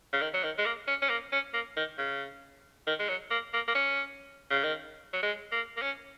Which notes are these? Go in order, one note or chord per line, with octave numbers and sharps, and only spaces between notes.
C#3
D#3
F#3
D#3
G#3
A#3
C#4
C#4
A#3
C#4
A#3
D#3
C#3
D#3
G#3
F#3
A#3
A#3
A#3
C#4
C#3
D#3
F#3
G#3
A#3
A#3
C#4